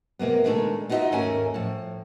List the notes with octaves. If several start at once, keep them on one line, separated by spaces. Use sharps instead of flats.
C3 G#3 A#3 B3
A#2 D#3 G#3 A3 D4 A4
D#4 F4 F#4 A#4 D#5 E5
D#2 G#2 A3 C#4 A#4 G#5
A2 F3